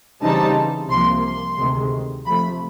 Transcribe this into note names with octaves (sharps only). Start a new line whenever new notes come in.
C#3 E3 G3 C4 D#4 A5
C2 C3 F3 A#3 C6
C6
D2 C3 D#3 G#3
C3 F3 A3 B5